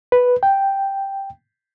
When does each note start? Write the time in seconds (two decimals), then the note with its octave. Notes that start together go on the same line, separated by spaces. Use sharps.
0.12 B4
0.43 G5